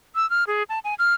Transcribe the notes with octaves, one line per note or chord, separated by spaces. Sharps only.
E6
F6
G#4
A5
G#5
F6